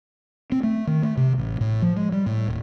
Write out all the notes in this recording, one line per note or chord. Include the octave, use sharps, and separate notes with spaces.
C4
A3
D#3
A3
C3
A1
A2
F3
G#3
G3
A2
D#1